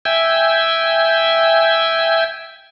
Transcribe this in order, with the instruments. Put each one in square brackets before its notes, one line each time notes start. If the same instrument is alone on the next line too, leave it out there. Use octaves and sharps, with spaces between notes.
[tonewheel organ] E5 G5 G#5